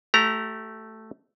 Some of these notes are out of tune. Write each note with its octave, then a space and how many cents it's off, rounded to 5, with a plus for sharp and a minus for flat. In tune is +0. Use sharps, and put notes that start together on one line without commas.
A3 +0 G4 -35 A#5 +0